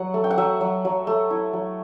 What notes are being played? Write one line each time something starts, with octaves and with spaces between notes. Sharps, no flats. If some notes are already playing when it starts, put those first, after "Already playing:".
Already playing: F#3 F#5
A3
G5
F#5
F#3 E5
F#3
F#3
A3
E4
F#3